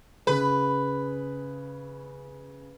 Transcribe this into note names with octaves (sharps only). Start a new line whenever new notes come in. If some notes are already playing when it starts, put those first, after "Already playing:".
C#3 G#4 B4 B5